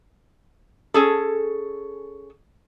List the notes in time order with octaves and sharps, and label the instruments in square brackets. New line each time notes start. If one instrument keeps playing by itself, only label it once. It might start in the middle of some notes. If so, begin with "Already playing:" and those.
[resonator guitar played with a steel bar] C#4 G#4 A4